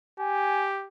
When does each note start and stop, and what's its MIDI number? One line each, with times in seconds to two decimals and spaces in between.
0.19 0.87 67
0.19 0.67 80